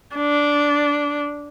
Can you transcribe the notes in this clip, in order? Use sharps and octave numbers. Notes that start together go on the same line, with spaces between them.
D4